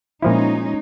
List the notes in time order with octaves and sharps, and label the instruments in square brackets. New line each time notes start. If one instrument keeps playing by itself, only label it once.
[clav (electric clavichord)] A#2 F3 E4 [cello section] G#3 C#4 D#4